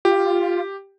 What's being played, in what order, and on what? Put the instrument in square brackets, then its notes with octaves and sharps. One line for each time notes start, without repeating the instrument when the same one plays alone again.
[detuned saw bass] F4 [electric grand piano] G4